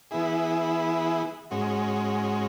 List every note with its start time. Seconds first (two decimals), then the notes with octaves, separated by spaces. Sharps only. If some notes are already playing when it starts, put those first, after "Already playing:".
0.11 E3 B3 E4 G#4
1.51 G#2 G#3 C#4 F#4